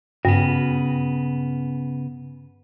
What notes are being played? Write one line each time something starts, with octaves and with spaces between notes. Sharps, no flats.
G2 C#3 B3